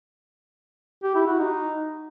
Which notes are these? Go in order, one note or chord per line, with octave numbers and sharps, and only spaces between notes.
G4
E4
F#4
D#4